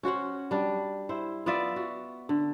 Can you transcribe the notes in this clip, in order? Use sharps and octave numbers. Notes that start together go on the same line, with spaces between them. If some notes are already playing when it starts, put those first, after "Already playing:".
C#4 F#4 C5 F#5
G3 D4
E4 C5
B3 F4 D5 E5
F#4
D3